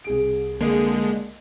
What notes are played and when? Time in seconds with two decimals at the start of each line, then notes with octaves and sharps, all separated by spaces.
0.04 C2 G#4 D7
0.61 D3 G#3 A#3